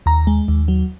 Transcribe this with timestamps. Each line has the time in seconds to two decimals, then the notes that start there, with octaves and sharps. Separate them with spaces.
0.06 D#2 A#5
0.27 G#3
0.48 D#2
0.68 F#3